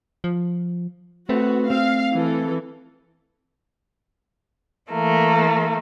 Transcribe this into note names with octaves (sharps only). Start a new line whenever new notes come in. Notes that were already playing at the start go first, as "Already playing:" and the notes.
F3
A3 C4 F#4 B4
C4 F5
E3 A4
E3 A3 A#3